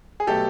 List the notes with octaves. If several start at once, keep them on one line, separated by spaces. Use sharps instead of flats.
G#4
B2 F#3 A3 G4 A4